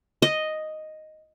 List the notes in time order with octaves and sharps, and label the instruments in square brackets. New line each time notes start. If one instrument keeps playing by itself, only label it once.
[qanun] D#5